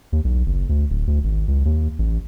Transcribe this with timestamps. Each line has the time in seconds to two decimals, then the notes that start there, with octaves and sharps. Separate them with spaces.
0.12 D#2
0.24 B1
0.46 F#1
0.69 D2
0.90 D1
1.07 D2
1.24 G#1
1.48 C#2
1.65 D#2
1.99 A1